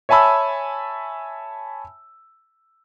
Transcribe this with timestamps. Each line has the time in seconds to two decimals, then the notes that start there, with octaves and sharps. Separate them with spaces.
0.09 C#5 E5 G#5 A5 B5 E6